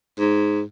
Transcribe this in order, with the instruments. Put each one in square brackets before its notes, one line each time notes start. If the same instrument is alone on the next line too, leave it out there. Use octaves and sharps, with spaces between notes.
[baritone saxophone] G#2